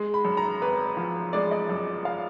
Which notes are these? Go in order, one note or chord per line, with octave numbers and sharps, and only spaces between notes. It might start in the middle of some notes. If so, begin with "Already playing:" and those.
Already playing: G#3
B5
F#2
A#5
G#1 B4
F3
G#3 D5
D#5
F#2
F5